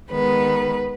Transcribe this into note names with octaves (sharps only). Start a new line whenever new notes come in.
D#3 G#3 B3 B4